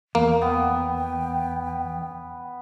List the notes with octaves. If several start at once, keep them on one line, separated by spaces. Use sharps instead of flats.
E2 A#3
B3 G5